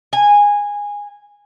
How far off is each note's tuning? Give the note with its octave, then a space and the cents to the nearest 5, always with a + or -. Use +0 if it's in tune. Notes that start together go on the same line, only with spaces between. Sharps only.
G#5 -15